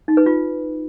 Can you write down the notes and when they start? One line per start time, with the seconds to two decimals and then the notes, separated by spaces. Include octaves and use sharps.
0.08 D#4
0.17 B4
0.26 F4